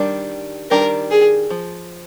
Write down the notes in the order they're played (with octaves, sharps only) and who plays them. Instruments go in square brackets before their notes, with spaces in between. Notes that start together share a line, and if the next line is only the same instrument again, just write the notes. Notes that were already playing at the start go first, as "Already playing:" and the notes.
Already playing: [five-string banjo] D#3 G3 D4 G4
[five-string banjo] D#3 G3 D4 G4 [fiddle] A#4
[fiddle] G#4
[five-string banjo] F3